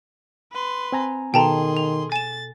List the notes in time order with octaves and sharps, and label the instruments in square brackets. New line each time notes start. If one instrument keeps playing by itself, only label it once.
[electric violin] B4 C6
[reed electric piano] C4 G#5 A#5
[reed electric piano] B2 A4 [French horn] D#3 [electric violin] G#4 C6 [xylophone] G5 A5 A#5
[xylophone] F7
[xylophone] G#5 E7 [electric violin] A6